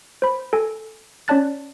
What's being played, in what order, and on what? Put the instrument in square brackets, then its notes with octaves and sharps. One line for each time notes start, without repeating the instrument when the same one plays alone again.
[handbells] C5 B5
A4 G#5
C#4 C#5 D5 A5 F#6 A6